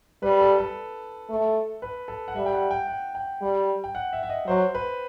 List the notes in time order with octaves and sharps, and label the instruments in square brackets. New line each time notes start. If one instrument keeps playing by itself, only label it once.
[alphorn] G3 [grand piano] B4
[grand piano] A4
A4
[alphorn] A3
[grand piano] B4
A4
F#5
[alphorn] G3 [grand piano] E5
[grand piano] G5
F#5
G5
F#5
G5
[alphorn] G3
[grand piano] G5
F#5
E5
E5
D#5
[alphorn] F#3 [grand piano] C5
[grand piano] B4